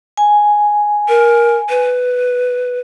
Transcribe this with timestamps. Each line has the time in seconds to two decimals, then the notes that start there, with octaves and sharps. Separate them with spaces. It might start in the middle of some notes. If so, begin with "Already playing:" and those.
0.17 G#5
1.08 A#4
1.70 B4